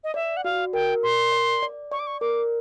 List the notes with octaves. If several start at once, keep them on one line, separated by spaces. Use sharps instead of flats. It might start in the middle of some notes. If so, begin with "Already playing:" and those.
D#5
D5 E5
F#5
F#4 F5
A#4 G5
A#4 C6
D5
D5
D5 C#6
D6
C#6
A#4 D6